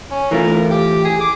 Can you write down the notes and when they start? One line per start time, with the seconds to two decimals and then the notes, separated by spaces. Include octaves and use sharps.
0.11 C#4
0.31 E3 A3 F4 A#4
0.70 G4
1.05 G#4
1.21 D6